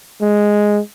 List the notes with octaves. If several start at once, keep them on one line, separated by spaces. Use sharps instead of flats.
G#3